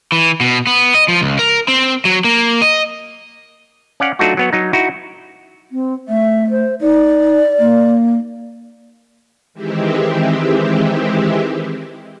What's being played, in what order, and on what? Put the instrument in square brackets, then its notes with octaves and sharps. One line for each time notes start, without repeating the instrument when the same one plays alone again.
[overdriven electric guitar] E3
B2
B3
D#5
F3
C#2
A#4
C4
F#3
A#3
D#5
[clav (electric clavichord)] C#4 D5 F5 F#5
F#3 A3 D4 D#4 F4 F#4
F#3 B3 C#5
F#3 D#4
D#4 E4 F#4
[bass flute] C4
[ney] A3 [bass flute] E5
[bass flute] C5
[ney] D#4 [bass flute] D5
[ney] A#3
[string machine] D#3 E3 G#3 C4 E4 G4